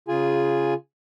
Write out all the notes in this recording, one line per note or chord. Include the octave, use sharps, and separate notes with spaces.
C#3 F4 G#4 G#5